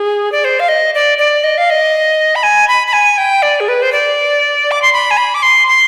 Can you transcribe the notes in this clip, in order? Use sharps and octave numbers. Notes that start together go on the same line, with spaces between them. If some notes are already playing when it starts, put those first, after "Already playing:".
Already playing: G#4
D5
C5
F5
D#5
D5
D5
D#5
F5
D#5
B5
G#5
B5
B5
G#5
G5
D5
G#4
B4
C5
D5
D6
C6
B5
G#5
B5
D6
C6
C6